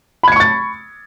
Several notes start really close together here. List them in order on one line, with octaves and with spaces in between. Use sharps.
B5 G#6 C#7 C#6 A6